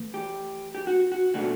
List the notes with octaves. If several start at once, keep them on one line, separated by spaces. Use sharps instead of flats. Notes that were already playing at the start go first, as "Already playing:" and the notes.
Already playing: E3 A3
G4
G4
F#4
F#4
B2 A3 D4 F#4